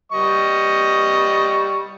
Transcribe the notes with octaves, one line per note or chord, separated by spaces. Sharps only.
G3 D#5 C#6